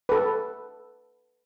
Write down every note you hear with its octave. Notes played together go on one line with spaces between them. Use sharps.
A4 B4